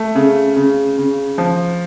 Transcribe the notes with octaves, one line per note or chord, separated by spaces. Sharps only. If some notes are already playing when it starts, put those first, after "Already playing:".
Already playing: A3
C#3
C#3
C#3
F3